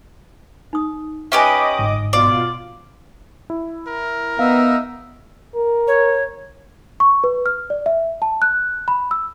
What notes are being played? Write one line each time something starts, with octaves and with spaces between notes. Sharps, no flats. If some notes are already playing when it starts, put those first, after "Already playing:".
D#4 D#6
C#4 G4 B4 D#5 E5 G#5 D6 D#6
G1 G#2
B2 F4 D5
E4
A#4
B3 D#4 E5 F5
A#4
C#5
C#6
B4
F6
D5
E5
A5
F#6
B5
E6